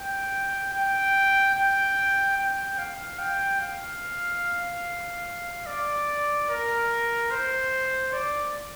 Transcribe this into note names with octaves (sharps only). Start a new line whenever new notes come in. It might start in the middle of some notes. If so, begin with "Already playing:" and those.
Already playing: G5
G5
G5
G5
F5
G5
F5
D5
A#4
C5
D5